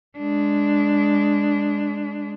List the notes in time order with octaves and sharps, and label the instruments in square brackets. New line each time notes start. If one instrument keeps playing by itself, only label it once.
[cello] G#3 D4